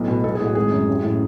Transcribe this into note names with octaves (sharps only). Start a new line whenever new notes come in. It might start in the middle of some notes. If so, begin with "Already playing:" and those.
Already playing: B1 A2 B4
B2
B1 A4
G#4
A2 F#4
G#1 G#4
F#2
A1
A2